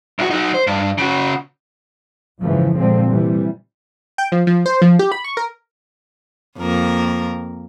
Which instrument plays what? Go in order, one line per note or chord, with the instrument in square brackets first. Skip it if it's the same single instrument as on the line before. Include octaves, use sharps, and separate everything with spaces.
[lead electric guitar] C2 F#4
F#3 D#4
C5
G2
C#3 F#4
[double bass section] F2 G#2 C#3 E3 F3
A#2 D3 F3 G#3 C4
C3 E3 G3
[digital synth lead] G5
F3
F3
C5
F3
G4
B5
C#6
A#4
[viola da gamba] F2 A#3 A#4